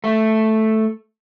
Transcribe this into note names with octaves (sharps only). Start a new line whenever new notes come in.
A3